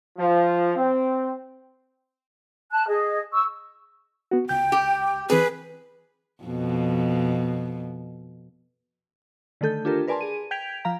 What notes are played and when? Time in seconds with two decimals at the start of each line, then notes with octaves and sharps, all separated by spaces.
0.17 F3
0.76 C4
2.71 A5 F#6
2.88 G#4 D#5
3.33 C#6 E6
4.31 B3 F#4
4.49 C#2 G5 G6
4.72 G4
5.30 E3 C4 G#4 B4
6.43 F2 B2
9.61 D3 D#3 A3 A4 G6
9.85 D4 F4 G4 A4 A#4
10.08 A#4 B4 D5 G#5 A5 C6
10.21 G#4 D#7
10.51 G5 G6 G#6 B6 D7 F7
10.85 F3 F5 A#5